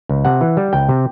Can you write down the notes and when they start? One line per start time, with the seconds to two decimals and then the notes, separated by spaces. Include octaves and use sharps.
0.09 C#2
0.25 C3 F#5
0.41 E3
0.57 G3
0.73 C#2 G5
0.89 C3